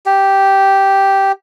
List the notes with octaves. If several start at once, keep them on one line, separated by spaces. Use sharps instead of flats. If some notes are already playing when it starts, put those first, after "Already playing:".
G4